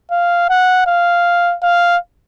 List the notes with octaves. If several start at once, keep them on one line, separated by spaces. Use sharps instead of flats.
F5
F#5
F5
F5